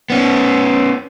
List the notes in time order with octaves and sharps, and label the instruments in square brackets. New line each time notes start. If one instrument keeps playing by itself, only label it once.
[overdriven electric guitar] B3 C#4